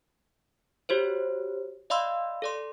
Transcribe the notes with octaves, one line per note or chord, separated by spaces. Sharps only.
F#4 G4 C5 C#5
D5 D#5 F5 B5 C6 E6
A4 D5 C6